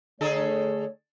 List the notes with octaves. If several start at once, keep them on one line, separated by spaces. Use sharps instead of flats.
D3 A3 G#4 A4 C#5